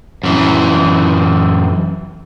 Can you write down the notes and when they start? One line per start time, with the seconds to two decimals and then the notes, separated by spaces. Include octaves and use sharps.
0.23 F#2 E3